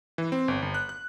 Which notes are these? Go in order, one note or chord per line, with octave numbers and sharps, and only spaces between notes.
E3
C4
G1
G1
F#6
F#6